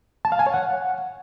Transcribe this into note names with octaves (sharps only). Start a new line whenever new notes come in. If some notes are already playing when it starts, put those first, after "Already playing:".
A5
F5
G#5
C#5
F#5